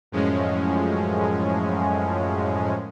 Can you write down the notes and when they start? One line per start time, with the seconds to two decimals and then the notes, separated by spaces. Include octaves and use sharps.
0.12 F#2 A2 F3 G#3 C#4